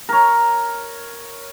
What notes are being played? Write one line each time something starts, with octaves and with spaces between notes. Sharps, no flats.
A#4 C#5